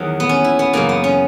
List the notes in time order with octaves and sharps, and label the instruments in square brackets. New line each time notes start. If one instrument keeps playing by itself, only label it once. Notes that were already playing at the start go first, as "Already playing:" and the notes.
Already playing: [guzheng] E2 D#3 F#3
B3
C#4
E4
B3
F#2 C#3 E3 A#3
B3
C#4